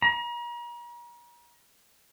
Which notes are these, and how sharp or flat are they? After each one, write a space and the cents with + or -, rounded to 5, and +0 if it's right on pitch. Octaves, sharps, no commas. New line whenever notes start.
A#5 +40